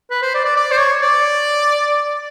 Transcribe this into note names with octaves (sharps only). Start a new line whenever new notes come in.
B4
C5
D5
D5
D5
C5
C#5
D5